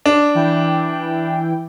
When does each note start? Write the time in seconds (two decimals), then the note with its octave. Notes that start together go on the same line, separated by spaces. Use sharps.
0.06 D4
0.35 E3 E4 G5